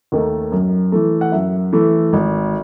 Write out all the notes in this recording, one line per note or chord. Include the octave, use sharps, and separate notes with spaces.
D#2 D#3 A3
F#2
E3 A3
F#5
F#2 E5
E3 A3
G#1